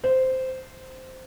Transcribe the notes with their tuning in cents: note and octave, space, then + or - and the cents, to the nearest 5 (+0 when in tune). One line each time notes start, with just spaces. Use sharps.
C5 -10